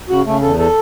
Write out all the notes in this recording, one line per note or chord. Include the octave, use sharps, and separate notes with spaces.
C#3 F#4
C#3 A3
E2 A4
A4